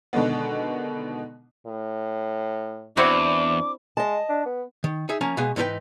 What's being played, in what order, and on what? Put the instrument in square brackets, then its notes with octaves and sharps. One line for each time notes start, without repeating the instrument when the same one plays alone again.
[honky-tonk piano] B2 D3 D#3 G#3 B3
[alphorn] A2
[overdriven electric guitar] E2 [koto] C4 E4 F#4 [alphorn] D4 [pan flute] D6
[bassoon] G#3 [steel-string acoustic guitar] D#5 A5
[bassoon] D4
B3
[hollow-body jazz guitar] D#3
D#4 G#4 E5
F3 A#3 C#4 G#5 A#5
B2 G#3 B3 F5 G#5
G#2 E3 D#4 A4 B4 G5